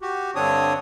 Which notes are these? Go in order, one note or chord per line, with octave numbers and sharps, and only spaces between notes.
F#4 G4
G2 D3 C4 D4 C#5 D#6